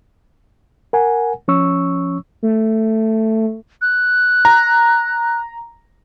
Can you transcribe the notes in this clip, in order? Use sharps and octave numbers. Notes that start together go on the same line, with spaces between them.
A#4 F#5 G#5
F3 C#4 C#5 C#6 E6
A3
F#6
A#5